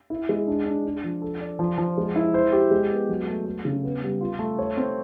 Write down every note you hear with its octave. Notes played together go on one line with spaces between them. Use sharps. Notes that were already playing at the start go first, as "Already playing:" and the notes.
E4
G#3
D4
D4
D4
F3
A4
D5
F3
F3
G#3
E4
C5
G4
G#3
B3
F#3
A3
A3
C#3
B3
G3
F4
A3
C#5
C4